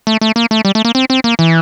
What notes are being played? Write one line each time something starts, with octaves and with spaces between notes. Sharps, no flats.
A3
A3
A#3
A3
G3
A3
A#3
C4
C4
A#3
E3